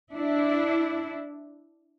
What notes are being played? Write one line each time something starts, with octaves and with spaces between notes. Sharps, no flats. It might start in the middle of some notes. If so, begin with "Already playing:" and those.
D4 E4